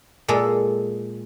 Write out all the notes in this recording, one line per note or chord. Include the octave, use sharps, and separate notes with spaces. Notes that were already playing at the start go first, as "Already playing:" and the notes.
A#2 G#3 A4